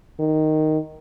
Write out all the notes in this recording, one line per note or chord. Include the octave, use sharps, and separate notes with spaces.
D#3